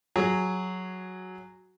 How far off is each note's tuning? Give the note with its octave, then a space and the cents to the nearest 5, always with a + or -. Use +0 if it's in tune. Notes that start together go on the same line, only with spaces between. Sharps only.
F#3 +0 G#4 +0